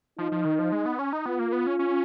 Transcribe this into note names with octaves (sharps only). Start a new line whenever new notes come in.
F3 D#4
F3
D#3
F3
G#3
B3
C#4
D#4
B3 F4
A#3
B3
C#4
C#4